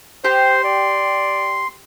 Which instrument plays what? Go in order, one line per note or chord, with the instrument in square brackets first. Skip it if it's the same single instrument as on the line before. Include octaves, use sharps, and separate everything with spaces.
[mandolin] G4 [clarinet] C5 [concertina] C6
[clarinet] D5